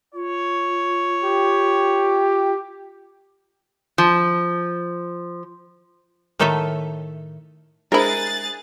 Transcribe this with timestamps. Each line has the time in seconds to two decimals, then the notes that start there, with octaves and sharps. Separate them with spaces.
0.14 F4 C#5
1.24 G4
3.98 F3
6.39 A2 D#3 D#4 A4 C#5 E5
7.92 G#3 D4 E4 G#4 A#4 C5 F#6 A6